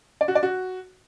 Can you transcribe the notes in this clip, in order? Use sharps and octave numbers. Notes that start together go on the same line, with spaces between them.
D5
F#4
D5
F#4